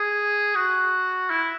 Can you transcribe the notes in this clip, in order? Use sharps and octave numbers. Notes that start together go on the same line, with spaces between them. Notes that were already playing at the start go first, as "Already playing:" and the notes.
Already playing: G#4
F#4
E4